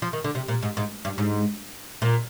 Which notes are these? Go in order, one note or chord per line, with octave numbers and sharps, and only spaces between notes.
F3
D#3
D3
C3
A#2
G#2
G#2
G2
G#2
A#2